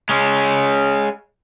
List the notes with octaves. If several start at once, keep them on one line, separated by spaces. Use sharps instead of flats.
G#3 C#4